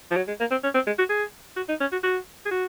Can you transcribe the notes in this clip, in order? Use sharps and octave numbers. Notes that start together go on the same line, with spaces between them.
F3
F#3
G#3
A#3
C4
C#4
C4
G#3
F#4
G#4
F#4
D#4
C#4
F#4
F#4
G#4
F#4